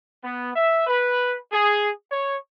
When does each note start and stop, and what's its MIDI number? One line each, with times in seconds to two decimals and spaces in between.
0.24 0.52 59
0.55 0.86 76
0.87 1.37 71
1.51 1.91 68
2.10 2.37 73